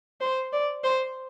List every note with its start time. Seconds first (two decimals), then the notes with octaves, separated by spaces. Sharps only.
0.21 C5
0.53 D5
0.84 C5